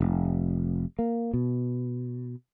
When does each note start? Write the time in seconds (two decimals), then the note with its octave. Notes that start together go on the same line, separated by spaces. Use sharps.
0.01 F1
0.99 A#3
1.33 B2